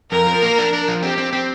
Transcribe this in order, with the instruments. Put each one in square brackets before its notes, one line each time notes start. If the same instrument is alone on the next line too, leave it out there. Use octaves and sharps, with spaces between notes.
[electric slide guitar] F2 [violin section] A#4
[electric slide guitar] F3
A#3
D4
D4
F3
[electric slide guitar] C4 [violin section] G4
[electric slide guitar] C4
C4